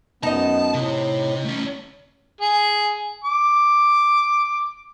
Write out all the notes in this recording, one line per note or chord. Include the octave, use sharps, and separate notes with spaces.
F#2 B3 D#4 D#5 A5
A2 C3
A3 C#4
G#4
D6